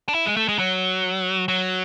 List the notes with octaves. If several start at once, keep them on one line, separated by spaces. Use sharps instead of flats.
D4
E4
G#3
A3
G#3
F#3
F#3